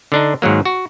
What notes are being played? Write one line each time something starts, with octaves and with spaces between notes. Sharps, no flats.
D3 D4 D#4
G#2 D#3 F#3 A#3
F#4